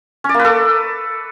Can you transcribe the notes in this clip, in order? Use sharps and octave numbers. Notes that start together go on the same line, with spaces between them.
C#4
D5
A#3
B4
A4